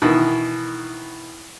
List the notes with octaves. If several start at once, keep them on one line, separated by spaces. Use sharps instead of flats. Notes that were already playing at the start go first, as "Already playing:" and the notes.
B2 D#3 E3